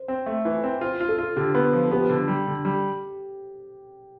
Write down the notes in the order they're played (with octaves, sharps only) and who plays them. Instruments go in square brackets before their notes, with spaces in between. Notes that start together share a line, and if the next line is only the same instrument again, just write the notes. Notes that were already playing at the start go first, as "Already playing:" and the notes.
Already playing: [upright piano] C5
[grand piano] C4
A3
E3
C4
[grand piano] F4 [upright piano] C5
[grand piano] F4
[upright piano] A4
[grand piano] F4
[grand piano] D3 [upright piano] G4
[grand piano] B3
F3
[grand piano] B3 [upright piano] G4
[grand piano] D3
G3
D3
G3